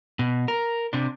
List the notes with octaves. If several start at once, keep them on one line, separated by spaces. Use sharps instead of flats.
B2
A#4
C3 D4